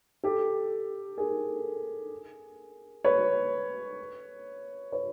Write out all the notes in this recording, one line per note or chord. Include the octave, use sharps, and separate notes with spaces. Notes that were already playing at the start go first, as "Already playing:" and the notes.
G4 A4
G#4 A#4
B4 C#5
B4 C#5